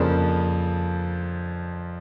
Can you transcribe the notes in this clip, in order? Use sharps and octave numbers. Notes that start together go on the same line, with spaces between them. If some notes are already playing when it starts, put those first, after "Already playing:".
Already playing: F2 C#3 F3 A#3 D4